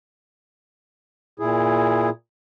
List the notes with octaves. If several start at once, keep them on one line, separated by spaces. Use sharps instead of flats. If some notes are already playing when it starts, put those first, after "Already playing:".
A#2 E4 G#4